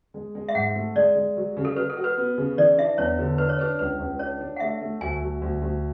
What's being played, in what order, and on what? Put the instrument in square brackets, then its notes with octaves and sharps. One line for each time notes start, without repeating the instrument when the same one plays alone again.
[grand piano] G#3
G#3
[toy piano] E5
[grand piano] G#2 [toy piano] F#5
[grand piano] A3
[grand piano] G#3 [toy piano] D5
[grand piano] G#3
F#3
C#3
[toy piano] A4
[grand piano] F#3 [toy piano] B4
[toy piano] A4
[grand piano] F#4
[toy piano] B4
[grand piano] B3
C#3
[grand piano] E3 [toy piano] D5
[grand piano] D4 [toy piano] E5
[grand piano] E2 [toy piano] C#5
[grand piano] D3
[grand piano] D4 [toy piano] B4
[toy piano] C#5
[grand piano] D4 [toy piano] B4
[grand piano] C#2 [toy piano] B4
[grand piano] C#2
[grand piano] D4 [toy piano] C#5
[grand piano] D4
[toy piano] F#5
[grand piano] A3 [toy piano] E5
[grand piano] A3
[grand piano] D2 [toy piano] G#5
[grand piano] F#3
D2
D2